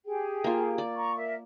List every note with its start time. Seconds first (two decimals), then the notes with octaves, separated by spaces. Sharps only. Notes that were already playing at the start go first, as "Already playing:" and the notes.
0.05 G4 G#4 G5
0.44 A#3 F4
0.78 D5
0.96 A#5 C#6
1.15 A#4 E5